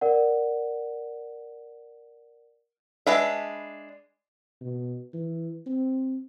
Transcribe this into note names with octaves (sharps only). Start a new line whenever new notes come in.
A#4 D5 F#5
G#3 D4 B4 E5
B2
E3
C4